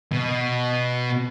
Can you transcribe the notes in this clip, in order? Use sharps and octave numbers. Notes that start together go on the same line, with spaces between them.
B2